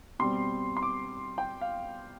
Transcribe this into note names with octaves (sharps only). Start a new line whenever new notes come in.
B2 G3 C4 C6
C6
D6
G5
F5